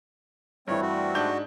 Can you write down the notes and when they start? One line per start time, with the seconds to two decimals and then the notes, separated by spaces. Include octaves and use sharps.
0.68 G2 E3 G3 A3 C4 C#5
0.81 F#4
1.15 G#2 D4 G6